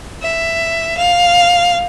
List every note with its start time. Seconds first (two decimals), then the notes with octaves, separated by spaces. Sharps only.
0.23 E5
0.97 F5